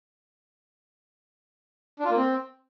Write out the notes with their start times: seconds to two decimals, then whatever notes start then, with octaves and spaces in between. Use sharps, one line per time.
1.99 D4
2.05 F4
2.11 A#3
2.16 C4